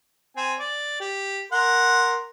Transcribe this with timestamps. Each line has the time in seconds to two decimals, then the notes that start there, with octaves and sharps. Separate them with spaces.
0.37 C4 G#5
0.60 D5
1.01 G4
1.52 A#4 F#5 C6